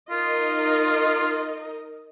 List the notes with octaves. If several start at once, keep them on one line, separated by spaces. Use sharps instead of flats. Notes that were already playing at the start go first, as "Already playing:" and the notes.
D#4 F4 A#4 D#5